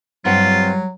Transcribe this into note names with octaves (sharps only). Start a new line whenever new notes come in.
G2 F#3 G3 C4 F4 F#5